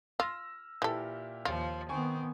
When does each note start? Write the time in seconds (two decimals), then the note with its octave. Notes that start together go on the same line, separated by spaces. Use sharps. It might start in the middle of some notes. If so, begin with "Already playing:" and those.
0.20 F4 E6 F6 A#6
0.82 A#2 E3 E4 G4 A4
1.45 D#2 F3 F4
1.89 D#3 B3 C4 G#5 C#6